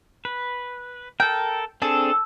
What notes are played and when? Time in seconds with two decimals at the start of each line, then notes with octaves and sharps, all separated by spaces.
0.25 B4
1.20 A4 A#4 G5
1.82 C4 D4 G#4 A4